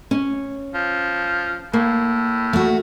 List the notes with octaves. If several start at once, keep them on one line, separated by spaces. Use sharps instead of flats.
C#4
F3
A2 A#3
A3 F#4